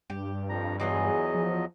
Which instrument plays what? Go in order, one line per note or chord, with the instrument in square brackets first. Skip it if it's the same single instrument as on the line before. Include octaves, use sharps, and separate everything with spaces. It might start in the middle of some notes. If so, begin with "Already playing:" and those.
[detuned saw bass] G2 [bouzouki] G4
[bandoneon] F2 F3 A#5
[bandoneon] E2 F#3 D#5 [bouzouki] E3 F4 G#4
[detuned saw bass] F3